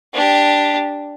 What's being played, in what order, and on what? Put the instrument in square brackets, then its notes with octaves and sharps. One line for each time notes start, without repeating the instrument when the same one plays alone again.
[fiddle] D4 G4